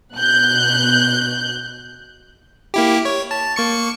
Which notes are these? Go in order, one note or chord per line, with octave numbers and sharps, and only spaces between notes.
B2 F#6 G6
A#3 E4 G4
C#5
A5
A#3 C#6 C#7